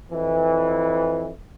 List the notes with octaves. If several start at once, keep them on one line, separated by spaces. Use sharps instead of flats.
F2 E3